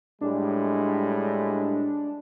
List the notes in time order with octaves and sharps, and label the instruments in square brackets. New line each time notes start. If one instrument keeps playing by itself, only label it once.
[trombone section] A2 G3 G#3 [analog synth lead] D4